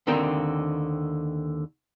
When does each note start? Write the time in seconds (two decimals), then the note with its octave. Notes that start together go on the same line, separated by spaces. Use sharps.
0.07 D#2 D3 D#3 C4 A#4 G5